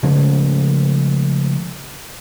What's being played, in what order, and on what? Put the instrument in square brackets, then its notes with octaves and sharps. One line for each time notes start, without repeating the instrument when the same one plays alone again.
[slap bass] C#3 F3 G#3 A3